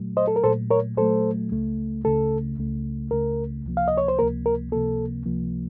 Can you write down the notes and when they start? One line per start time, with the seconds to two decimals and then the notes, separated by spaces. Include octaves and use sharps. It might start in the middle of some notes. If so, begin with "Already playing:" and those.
Already playing: A#2 F#3 A3
0.17 C5 D#5
0.28 A4
0.36 A#4
0.44 A#2 F#3 A3 A4 C5
0.71 A#4 C#5
0.97 A#2 F#3 A3 A4 C5
1.51 C#2 C#3 A3
2.04 C#2 C#3 A3 A4
2.58 C#2 C#3 A3
3.11 C#2 C#3 A3 A#4
3.65 C#2 C3 F3 A#3
3.77 F5
3.88 D#5
3.97 C#5
4.08 C5
4.19 C#2 C3 F3 A#3 A#4
4.46 A#4
4.72 C#2 C3 F3 A#3 A4
5.26 C#2 C3 F3 A#3